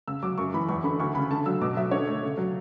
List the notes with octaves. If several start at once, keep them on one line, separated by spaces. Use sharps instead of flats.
C#3 E6
F#3 D6
F#2 C#6
E3 B5
E2 C#6
D3 B5
D2 C#6
C#3 B5
D3 A5
F#3 E6
B2 D6
F#3 E5
D3 C#5
A3
C#3
F#3